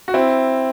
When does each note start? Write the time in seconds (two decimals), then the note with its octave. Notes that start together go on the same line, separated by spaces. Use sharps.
0.08 F#4
0.14 C4 E4